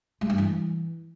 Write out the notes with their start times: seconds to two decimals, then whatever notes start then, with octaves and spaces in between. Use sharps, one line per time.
0.21 G#3
0.30 G2
0.38 E3